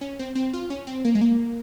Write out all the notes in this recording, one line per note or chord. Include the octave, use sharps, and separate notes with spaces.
C#4
C4
C4
F4
C#4
C4
A#3
G#3
A#3